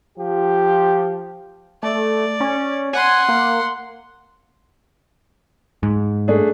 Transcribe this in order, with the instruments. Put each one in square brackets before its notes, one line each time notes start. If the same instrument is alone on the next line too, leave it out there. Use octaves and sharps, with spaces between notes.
[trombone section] F3 F4 G4
[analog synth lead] A3 [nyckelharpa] D5
[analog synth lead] C#4
[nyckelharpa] F#5 C6 [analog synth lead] G#5
[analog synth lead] A#3
[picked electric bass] G#2
[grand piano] A3 D4 G#4